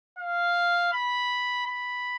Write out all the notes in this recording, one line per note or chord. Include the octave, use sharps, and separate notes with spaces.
F5
B5
B5